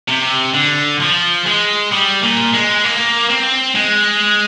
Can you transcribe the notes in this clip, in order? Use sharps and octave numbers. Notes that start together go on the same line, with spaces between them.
C3
D3
F3
G#3
G3
A#2
G#3
A#3
C4
G#3